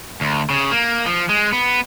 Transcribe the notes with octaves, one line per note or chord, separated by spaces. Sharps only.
D2
C#3
A#3
F3
G#3
B3